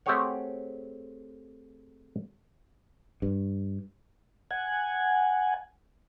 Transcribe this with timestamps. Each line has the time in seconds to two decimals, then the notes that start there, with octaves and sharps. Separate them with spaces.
0.06 A3 C4 G4 G#4 C#5 F#5
3.22 G2
4.51 F#5 G#5